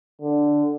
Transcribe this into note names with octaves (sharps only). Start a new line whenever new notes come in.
D3